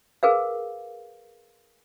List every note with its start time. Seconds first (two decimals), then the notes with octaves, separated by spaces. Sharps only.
0.23 G#4 A#4 B4 F5